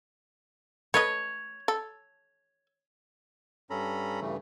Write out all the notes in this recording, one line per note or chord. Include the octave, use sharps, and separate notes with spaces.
A3 B4 C#5 D#5
A4
G2 C#4 A4 A#5 B5
G2 C#3 E3 A3